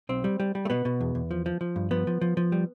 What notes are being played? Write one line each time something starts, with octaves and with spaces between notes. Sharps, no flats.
B1 C4
G3
G3
G3
A3
B2 B3
B2
E2
E2
F3
F3
F3
G2
F3 B3
F3
F3
F3
G3